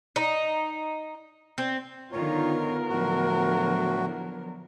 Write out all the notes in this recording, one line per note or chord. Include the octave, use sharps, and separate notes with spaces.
D#4
C4
D3 D#3 B3 F4 A#4 C#5
A2 D3 F3 F#3 F#4